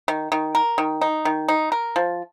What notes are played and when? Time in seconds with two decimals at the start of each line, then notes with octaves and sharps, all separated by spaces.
0.08 D#3
0.32 D#3
0.55 A#4
0.78 D#3
1.01 D#4
1.25 D#3
1.48 D#4
1.72 A#4
1.96 F3